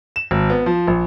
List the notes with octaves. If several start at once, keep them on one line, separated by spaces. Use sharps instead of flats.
E7
G#1
B3
F3
A#1